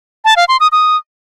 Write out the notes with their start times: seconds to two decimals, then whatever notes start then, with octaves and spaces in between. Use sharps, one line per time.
0.25 A5
0.37 F5
0.48 C6
0.60 D#6
0.72 D#6